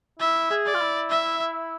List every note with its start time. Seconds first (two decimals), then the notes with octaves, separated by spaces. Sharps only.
0.19 E4 E5
0.50 G#4
0.66 D5
0.74 F4
0.81 E4
1.10 E5